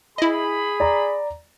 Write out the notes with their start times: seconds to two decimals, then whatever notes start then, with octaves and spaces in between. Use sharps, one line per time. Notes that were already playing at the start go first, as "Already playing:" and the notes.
0.18 E4 G#4 D#5 B5
0.80 D5 A#5